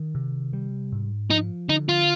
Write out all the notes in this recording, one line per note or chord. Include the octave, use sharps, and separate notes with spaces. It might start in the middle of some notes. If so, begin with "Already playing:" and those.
Already playing: D#3
C3
G3
G#2
F3 D#4
D3 D#4
F4